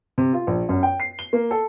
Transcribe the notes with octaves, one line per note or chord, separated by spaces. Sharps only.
C3
F4
A#1
F#2
G5
C7
G7
A#3
A4